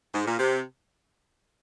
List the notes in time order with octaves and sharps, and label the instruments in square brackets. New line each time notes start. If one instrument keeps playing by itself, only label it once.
[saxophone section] G#2
A#2
C3